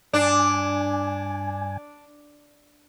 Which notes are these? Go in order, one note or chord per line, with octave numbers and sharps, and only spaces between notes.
G2 D4 G#5